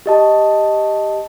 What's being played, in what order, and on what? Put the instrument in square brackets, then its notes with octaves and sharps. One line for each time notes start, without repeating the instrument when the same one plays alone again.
[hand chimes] G4 D#5 A5